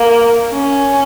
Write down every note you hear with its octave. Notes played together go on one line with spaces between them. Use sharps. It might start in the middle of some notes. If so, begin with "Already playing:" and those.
Already playing: A#3
C#4